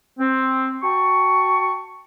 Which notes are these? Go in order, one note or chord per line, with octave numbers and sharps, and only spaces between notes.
C4
F#4 G5 A5 C#6